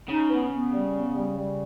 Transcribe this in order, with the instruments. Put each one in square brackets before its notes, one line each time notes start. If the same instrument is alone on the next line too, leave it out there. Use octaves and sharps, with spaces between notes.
[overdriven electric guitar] C#3 [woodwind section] D#4
[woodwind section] B3
B3
G3
B3
G3
G3